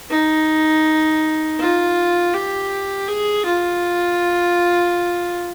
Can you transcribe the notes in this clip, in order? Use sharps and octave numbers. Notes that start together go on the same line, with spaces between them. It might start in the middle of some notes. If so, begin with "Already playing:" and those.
D#4
F4
G4
G#4
F4